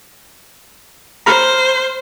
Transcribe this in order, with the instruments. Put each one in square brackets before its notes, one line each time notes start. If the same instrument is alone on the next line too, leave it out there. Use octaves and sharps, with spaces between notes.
[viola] C5 [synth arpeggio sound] A#5 B5 F6